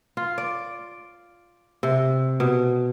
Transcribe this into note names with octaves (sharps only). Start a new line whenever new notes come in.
F4
D5
C3
B2